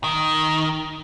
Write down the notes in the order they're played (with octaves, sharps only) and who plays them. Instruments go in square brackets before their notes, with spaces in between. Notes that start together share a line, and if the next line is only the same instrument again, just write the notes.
[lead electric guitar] D#3